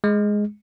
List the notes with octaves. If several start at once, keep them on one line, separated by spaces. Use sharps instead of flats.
G#3